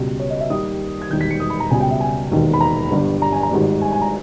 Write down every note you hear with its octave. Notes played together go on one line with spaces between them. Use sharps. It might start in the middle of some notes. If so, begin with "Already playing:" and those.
Already playing: C#2 B2 G3
C#5
D#5
E5
D#2 D#3 G3 D#6
G#6
E1 D#2 D#3 G3 G6
B6
C#7
D#6
B5
A#5
C#2 B2 G3 G#5
G5
E5
G#5
E1 D#2 D#3
B5
A#5
G1 G2 G3
A#5
G#5
A#5
G#1 G#2 G3
G#5
G#5
A#5